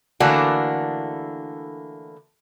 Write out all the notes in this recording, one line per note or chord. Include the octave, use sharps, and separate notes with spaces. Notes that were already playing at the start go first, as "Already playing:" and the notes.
D3 E3 A3 A#3 D4 F#4